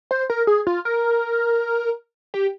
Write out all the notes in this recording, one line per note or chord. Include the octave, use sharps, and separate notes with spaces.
C5
A#4
G#4
F4
A#4
G4